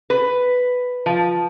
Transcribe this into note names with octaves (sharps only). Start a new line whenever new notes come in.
B4
F3